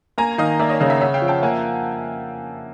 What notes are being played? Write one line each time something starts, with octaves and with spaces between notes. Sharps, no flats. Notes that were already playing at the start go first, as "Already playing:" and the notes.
A#3 G#5 A#5
D#3 D#5 F5
A#3 D5 E5
C#5 D#5
C#3 D#5 F5
E5 F#5
C#4 E5 F#5
F5 G5
F3
G5 A5
A#3 F#5 G#5